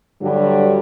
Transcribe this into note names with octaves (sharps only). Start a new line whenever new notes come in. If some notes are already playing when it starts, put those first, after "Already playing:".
G2 D3 F#3 G3